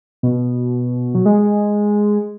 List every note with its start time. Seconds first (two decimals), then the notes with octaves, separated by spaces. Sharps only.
0.23 B2
1.15 F#3
1.25 G#3